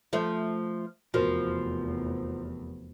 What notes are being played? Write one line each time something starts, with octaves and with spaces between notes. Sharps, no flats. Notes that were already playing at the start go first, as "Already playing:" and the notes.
F3 A3
F1 E2 F3 F#4 A#4 C5